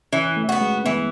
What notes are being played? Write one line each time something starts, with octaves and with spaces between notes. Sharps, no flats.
E3 C#4
A3
B3 F#4
G#3
E3 B3